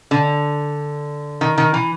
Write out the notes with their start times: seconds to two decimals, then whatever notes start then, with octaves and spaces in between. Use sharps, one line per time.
0.11 D3
1.41 D#3
1.58 D#3
1.74 E3